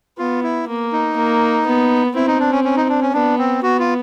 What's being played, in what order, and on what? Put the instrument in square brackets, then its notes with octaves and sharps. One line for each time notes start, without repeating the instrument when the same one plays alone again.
[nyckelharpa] B3 [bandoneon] F4
[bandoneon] E4
[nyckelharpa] A#3
[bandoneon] D#4
[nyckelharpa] A#3
B3
[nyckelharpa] C4 [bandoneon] E4
[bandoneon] D#4
D4
C#4
C#4
D#4
D4
C#4
[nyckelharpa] B3 [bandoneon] D4
[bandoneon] C4
[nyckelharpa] B3 [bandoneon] F#4
[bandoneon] F4